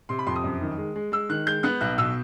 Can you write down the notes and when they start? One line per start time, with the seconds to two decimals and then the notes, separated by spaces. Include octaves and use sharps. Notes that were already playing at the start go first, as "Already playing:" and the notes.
0.09 C3 C6
0.19 B5
0.27 F2 C6
0.36 D#6
0.44 F#2
0.62 D#3
0.78 G#3
0.96 G#3
1.12 G#3 E6
1.29 D#3 F#6
1.47 G#3 G6
1.63 B3 F#6
1.81 B1 F#6
1.98 B2 E6